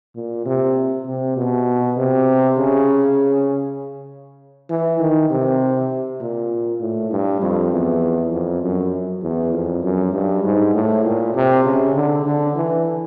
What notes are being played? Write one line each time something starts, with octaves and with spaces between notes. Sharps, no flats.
A#2
C3
C3
B2
C3
C#3
E3
D#3
C3
A#2
A2
G2
F2
E2
F2
F#2
E2
F2
F#2
G2
G#2
A2
A#2
C3
C#3
D3
D3
E3